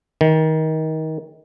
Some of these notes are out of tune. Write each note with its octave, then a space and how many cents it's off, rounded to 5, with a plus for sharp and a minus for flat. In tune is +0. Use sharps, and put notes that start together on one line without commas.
D#3 +25